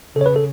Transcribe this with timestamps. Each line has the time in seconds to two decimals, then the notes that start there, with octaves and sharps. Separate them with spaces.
0.16 C#3 A4
0.21 C#5
0.26 B4
0.36 A4